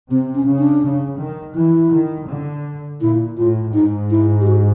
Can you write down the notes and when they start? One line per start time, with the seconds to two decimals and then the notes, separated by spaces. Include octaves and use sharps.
0.11 C3 C4
0.35 C#4
0.47 C#3
0.59 D4
0.83 C#3
1.19 D#3
1.55 E3 E4
1.92 D#3
2.29 D3
3.01 A#2 E4
3.38 A2 F4
3.74 G#2 D#4
4.11 E4
4.41 G4
4.47 F#4